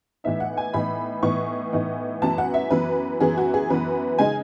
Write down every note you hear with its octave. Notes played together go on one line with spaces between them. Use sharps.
A2 E3 B3 D#4 E5
F#5
G#5
A2 E3 B3 D#4 B5
A2 E3 B3 D#4 C#6
A2 E3 B3 D#4
F#2 E3 B3 A5
F#5
E5
F#2 E3 B3 B4
F#2 E3 B3 G#4
F#4
G#4
F#2 E3 B3 B4
C#3 G#3 D#4 G#5